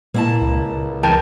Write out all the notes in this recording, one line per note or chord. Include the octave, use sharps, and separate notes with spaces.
A#2 A#3 E4 A5
C#2
E2 A#4 G5 A5